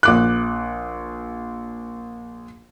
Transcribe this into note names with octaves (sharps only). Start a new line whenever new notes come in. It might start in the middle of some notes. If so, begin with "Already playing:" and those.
A#1 D6 F#6